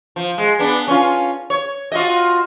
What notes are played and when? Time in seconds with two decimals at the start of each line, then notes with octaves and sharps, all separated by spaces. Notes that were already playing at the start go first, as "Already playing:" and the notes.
0.16 F3
0.38 G#3
0.59 B3 D4
0.88 C#4 F4
1.50 C#5
1.92 F4 F#4 D#5